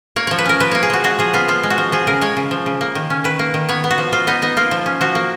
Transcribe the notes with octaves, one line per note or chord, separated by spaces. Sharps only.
A#3 C#5
F3 C#5
B4
C#4 A#4
F3 B4
A#3 C#5
G#4
F3 F#4
G#3 F#4
F3 G#4
B3 F4
F3 F4
G#3
F#4
F3
F3 G#4
C#3 A#4
G#3 C#5
C#3
F3
C#3
A#3
D#3
C#4
D#3 B4
A#3
D#3
B3 C#5
B3
F#4
F3
F3 F4
B3 D#4
B3 D#4
A#3 F4
F3
C#4
F3 F#4
A#3